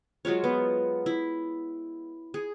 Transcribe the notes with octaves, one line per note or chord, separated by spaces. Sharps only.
F#3 G#3 F4 C#5
B3
E4
G#4